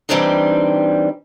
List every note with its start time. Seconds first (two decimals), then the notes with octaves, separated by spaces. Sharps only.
0.09 E3 G3 G#3 C4 D4 D#4